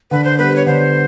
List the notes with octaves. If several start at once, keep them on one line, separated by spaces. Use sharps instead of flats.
D3 B4
C5
G3 B3 B4
C#5
D3 C5